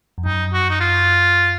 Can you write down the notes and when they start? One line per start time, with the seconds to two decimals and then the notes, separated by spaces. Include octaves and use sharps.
0.18 F2
0.26 F#2 D#4
0.53 F#4
0.70 D#4
0.80 F4